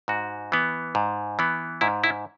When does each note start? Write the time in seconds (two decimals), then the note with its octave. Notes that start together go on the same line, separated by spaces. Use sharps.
0.08 G#2 F#4
0.52 E3 B3
0.95 G#2
1.39 E3 B3
1.81 G#2 E4
2.04 E4